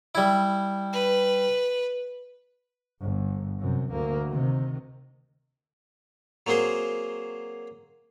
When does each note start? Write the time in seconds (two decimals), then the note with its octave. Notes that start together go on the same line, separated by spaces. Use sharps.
0.15 G3 E4
0.93 B4
3.01 G1
3.59 F#2 C3
3.90 D2 A#3
4.30 C3 D#3
6.47 F#3 A#3 C4 G#4 C5